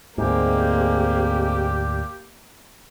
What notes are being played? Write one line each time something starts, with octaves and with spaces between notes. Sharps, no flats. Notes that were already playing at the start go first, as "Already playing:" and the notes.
D2 G#2 G#3 A#3 C4 G4